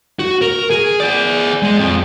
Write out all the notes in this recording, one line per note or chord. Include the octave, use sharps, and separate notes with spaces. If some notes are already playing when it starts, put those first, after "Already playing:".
F#4
A#4
G#4
G#4 D5
G#3
F2